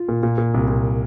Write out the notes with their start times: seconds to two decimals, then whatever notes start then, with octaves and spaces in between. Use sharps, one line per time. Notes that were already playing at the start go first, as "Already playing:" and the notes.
Already playing: F4
0.09 A#2
0.23 A#2
0.38 A#2
0.54 C2
0.68 A#2